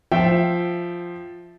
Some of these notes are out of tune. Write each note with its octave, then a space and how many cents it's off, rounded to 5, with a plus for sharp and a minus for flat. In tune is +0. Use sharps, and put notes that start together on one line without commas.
F3 +0 E5 +0 G5 -15